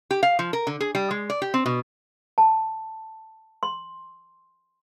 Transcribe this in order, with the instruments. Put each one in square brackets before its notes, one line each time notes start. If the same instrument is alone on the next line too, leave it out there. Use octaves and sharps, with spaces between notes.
[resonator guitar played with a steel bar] G4
F5
F3
A#4
D3
G#4
G3
G#3
D5
G4
C4
B2
[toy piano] A5
C6